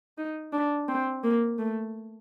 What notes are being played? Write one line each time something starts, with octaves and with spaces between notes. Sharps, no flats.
D#4
D4
C4
A#3
A3